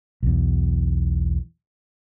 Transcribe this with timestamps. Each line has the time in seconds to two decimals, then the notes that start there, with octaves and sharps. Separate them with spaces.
0.23 B1 E2